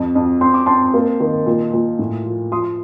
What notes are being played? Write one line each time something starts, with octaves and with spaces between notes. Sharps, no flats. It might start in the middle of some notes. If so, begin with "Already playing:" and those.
Already playing: F2
F2
C4 C6
D6
C4 A5 C6
A#3
D#3
A#2
A#2
A2
F3
F3 C6 D#6